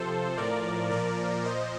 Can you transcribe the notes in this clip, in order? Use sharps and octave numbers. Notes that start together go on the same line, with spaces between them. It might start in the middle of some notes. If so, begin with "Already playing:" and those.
Already playing: C3 F3 A4 C5
A2 F3 A#4 D5
A#2 F3 A#4 D5
A#2 F3 C5 D#5